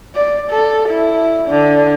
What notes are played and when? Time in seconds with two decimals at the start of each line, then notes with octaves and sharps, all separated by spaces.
0.15 D5
0.51 A4
0.89 E4
1.49 D3